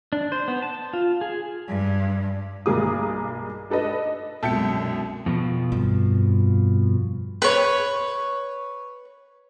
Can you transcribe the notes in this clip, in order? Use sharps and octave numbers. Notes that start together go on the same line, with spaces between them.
D4
C5
B3
A5
F4
G#4
G2
B1 G2 A#3 G#4 D6 D#6
D4 A4 B4 D#5
C2 F#2 B2 G#3 A4 E5 G5 C#7
F2 B2 F3
G2
B4 C#5